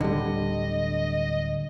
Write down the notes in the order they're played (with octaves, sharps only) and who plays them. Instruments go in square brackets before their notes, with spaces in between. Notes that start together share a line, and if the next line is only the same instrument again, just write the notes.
[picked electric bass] D1 G3 [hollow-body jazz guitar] D3 [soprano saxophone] D#5